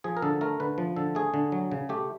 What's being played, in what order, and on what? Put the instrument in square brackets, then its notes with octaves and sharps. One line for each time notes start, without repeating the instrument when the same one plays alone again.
[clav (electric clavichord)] F3 G#4
A#4
D3 A4
A3 A#4
D3 B4
F3
D3 A4
A3 G#4
D3
F#3
C#3
A3 G4